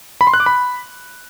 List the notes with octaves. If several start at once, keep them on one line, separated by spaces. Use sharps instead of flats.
B5
C6
F#6
D6
B5